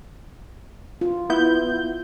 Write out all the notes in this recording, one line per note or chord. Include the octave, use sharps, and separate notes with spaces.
F4
B3 E4 G6